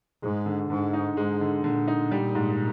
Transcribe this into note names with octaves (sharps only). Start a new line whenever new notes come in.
G#2 G#3
D3
G#2 D3
D#4
G#2 G#3
D3
A#2 D3
D#4
G3
G#2